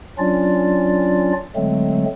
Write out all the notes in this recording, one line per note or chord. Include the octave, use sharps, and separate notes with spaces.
F#3 C#4 D4 F4 D5
D3 F#3 G#3 A3 C4